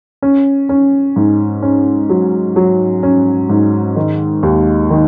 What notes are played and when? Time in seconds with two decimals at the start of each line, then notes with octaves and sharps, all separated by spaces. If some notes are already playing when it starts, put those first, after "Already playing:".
0.22 C#4
0.69 C#4
1.16 G#2
1.62 C#4
2.09 F#3
2.56 F#3
3.03 C#4
3.49 G#2
3.96 D#3
4.43 D#2
4.90 D#3